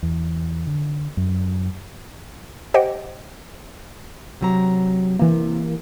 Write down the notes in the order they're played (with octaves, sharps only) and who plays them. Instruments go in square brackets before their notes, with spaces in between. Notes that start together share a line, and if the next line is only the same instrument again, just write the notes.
[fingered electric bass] E2
D3
F#2
[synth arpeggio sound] G4 C5 D#5 F#5 G5
[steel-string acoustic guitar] C3 F#3 A#5
[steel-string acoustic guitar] C3 [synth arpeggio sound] E3 A#3